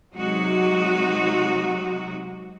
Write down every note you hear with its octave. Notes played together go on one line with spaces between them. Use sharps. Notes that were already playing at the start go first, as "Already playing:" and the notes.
C3 F#3 G#3 D#4 F#4